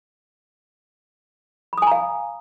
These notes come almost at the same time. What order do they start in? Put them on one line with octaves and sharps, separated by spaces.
B5 D#6 G#5 A#5 F5